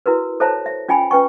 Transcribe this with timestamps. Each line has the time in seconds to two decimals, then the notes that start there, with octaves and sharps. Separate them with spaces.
0.06 E4 F#4 A#4 B4
0.40 A4 C5 C#5 E5 A5 A#5
0.66 E5
0.88 C#4 F4 G5 G#5 B5
1.11 C#4 B4 G5 C#6